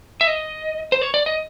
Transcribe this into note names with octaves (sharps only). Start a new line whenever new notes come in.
E5
D#5
C5
C#5
D5
D#5